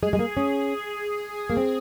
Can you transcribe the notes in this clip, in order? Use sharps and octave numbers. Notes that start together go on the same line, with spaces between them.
G#3 G#4
G#3
A#3
C#4
A#3
C4